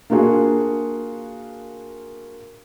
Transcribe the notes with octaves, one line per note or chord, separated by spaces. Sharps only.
A#3 D4 F4 F#4 G#4